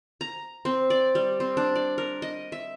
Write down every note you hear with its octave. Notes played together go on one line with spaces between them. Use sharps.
A#5
C4
D5
G3
C4
D4
D5
A#4
D#5
E5